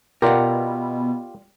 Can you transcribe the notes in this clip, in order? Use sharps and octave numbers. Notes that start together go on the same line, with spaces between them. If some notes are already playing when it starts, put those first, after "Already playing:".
B2 F4 G4 A#4 D5 F#5